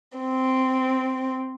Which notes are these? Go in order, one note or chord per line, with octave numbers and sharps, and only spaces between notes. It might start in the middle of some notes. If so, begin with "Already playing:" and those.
C4